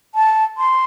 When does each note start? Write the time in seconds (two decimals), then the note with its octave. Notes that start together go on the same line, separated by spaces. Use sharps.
0.15 A5
0.58 C6